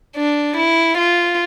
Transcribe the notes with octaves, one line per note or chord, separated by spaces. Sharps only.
D4
E4
F4